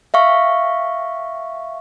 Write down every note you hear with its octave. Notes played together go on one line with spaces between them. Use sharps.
E5 F5 C#6